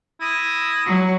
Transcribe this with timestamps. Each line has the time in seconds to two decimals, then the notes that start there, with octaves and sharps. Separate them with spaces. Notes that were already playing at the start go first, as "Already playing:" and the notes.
0.21 E4 D#6 A#6
0.87 F#3